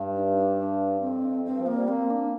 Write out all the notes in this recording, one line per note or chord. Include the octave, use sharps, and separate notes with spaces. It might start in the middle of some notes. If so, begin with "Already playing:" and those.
Already playing: G2
D#4
D4
D4
F2 C4
G2 C4
F3
A#3
G3
A#3 C4
D4